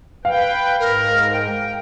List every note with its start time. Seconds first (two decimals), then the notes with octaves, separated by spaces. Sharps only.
0.25 B4 F5 G5
0.80 G#2 A#4
1.33 G5